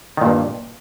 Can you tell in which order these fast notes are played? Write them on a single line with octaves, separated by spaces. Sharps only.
D#3 A#2 G2